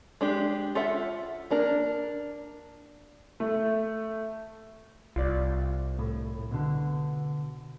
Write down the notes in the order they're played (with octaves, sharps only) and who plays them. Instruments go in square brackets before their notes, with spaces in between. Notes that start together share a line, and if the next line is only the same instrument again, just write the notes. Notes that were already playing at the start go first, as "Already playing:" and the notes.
[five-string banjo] G#3 D4 G4
F4 A4 E5 F#5
A#3 D4 A#4
[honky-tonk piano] A3
[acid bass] C2 [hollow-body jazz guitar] F4 D5
[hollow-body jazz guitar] A2
B2 D3